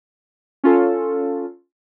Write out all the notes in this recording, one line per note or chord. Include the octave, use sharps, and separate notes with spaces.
C#4 F4 A4